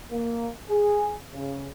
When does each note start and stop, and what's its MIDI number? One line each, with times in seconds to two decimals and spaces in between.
0.11 0.49 58
0.70 1.12 68
1.31 1.68 49